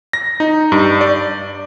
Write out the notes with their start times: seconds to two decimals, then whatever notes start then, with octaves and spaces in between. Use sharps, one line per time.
0.13 A#6
0.40 D#4
0.72 G2
1.01 D5